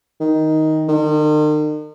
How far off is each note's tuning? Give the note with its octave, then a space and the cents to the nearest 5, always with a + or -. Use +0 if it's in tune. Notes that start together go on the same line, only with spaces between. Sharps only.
D#3 +10
D#3 -40